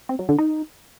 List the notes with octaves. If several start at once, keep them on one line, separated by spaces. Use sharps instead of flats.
C4
F#3
D3
D#4